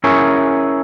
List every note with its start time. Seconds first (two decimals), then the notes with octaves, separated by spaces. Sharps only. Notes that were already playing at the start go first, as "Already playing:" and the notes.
0.04 C#4 E4 G#4 A#4 C#5